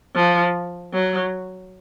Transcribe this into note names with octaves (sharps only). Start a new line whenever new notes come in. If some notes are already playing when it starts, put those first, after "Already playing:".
F3
F#3